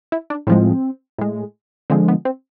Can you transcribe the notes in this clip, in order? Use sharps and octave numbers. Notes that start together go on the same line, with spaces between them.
E4
D4
A2 F3 G#3 C4
A2 G#3
D3 F3 G#3 C4
B3
C4